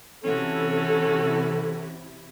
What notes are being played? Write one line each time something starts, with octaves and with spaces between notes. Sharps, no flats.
C3 E3 C#4 E4 F#4 A4